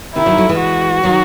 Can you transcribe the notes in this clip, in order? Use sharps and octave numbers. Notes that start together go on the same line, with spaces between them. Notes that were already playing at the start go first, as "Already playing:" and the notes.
C3 D#3 E4
D#3 F#3
F#3 A3
E3 G#3
F#4
D#3 F#3